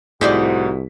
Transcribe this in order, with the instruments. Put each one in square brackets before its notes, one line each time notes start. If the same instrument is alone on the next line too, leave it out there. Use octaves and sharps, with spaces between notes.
[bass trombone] C2 [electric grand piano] A2 G#4 B6 [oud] D#4 C5 D5 [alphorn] F#4